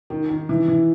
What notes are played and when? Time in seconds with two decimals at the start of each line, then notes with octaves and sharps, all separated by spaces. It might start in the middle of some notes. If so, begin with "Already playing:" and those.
0.10 D#3
0.30 D#3
0.49 E3
0.68 E3